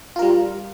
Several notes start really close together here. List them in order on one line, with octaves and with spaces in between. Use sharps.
F4 A#4 G3